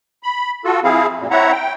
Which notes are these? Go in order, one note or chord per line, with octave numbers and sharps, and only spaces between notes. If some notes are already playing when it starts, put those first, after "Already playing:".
B5
F4 F#4 A4
F3 C4 E4 G#4 F5
F#2 A#2
C4 E4 C#5 E5 F#5 A#5
G5